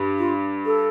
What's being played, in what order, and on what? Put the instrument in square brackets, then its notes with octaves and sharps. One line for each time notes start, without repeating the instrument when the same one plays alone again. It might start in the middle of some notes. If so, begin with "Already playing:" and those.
Already playing: [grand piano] G2
[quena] F4
A4